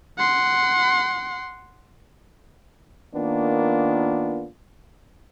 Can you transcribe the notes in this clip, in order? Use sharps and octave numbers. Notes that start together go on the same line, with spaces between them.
F#5 C6
D#3 A#3 B3 D4 F4